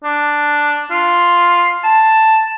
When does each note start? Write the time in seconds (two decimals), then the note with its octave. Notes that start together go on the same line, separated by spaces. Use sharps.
0.04 D4
0.91 F4
1.84 A5